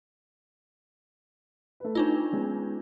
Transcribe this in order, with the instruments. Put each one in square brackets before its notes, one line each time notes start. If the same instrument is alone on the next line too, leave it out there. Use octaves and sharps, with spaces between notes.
[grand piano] A3 B4
[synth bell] D4 D#4 F4
[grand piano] G#3 B3 C#4